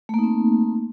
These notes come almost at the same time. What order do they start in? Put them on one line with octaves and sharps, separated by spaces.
A3 A#3 D#4 C4